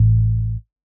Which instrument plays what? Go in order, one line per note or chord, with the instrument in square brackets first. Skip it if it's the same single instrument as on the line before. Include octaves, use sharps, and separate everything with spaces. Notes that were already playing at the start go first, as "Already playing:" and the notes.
Already playing: [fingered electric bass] A1 A2